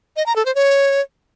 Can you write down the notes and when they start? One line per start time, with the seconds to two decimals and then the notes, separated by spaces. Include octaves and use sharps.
0.16 D#5
0.26 A#5
0.36 A4
0.45 C5
0.55 C#5